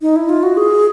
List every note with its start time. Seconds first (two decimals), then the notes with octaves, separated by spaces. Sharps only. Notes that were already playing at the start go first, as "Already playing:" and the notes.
0.02 D#4
0.16 E4
0.29 F4
0.43 F#4
0.57 G#4